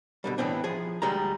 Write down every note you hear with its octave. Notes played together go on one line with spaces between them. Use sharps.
B2 D3 G3
A2 E3 B3 C4 D4
F3 G#4
D2 G3 G#3 A#5